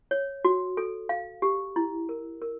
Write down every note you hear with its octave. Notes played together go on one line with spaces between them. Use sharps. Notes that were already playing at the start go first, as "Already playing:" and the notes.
C#5
F#4
A4
F5
G4
E4
A#4
A#4